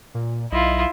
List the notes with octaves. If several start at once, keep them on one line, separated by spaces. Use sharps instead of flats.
A#2
B1 E4 F4 D#5